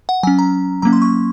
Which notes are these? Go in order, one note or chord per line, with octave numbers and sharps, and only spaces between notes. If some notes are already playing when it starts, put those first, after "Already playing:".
F#5
F#3 C#4 G#5
A#5
F#3 A#3 C#4 A#5
C6
C#6